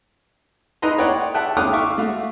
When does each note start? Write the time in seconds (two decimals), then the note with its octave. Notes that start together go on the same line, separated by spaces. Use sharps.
0.82 D#4 E4 B4 A#5 C6
0.98 C#5 D5 F#5 G5
1.34 E5 F#5 G5 A5 F#6
1.57 F5 G5 D6 D#6 F6 F#6
1.73 E5 F5 C#6 D6
1.98 A3 F#4 F5